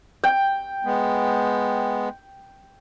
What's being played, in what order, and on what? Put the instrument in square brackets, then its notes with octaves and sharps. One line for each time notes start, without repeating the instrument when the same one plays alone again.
[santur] G5
[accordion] G#3 B3